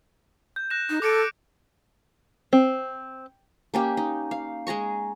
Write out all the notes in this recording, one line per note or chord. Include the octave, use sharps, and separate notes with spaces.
G6
F#6 A#6 E7
D#4
A4 D6 C#7 D7
C4
A#3 C#4 G4
D#4
F5
G#3 G#4 A#5 C#6